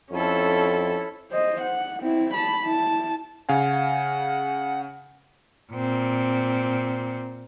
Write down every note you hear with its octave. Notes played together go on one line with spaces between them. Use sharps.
F2 C#4 E4 A4
C5 D#5
F#5
C4 E4
A5 B5
E4 A5
C#3 F5 F#5 G#5
A#2 C4